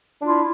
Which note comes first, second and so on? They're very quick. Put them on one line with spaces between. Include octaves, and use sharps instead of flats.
D4 F4 E4